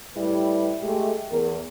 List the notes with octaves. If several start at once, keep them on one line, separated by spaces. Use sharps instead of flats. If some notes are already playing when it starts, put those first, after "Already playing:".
A2 G3 E4 G4 B4
G#3 A3 G4
E2 A#4